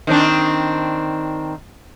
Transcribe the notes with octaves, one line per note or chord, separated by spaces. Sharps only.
D#3 C4 D4